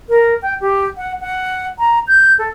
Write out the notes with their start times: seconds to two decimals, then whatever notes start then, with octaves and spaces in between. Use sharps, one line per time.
0.09 A#4
0.42 G5
0.61 G4
0.97 F#5
1.21 F#5
1.79 A#5
2.08 G6
2.39 A4